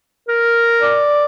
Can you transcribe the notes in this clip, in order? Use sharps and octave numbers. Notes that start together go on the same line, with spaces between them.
A#4
D5